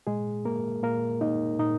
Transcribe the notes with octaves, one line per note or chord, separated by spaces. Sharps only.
A#2 G#3 G#4
A#3 A#4
A#2 A#3 A#4
A#3 D#4 D#5
A#2 D#4 D#5